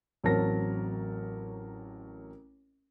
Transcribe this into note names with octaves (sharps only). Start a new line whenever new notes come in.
A1 F#3 C4 A#4 A5 A#6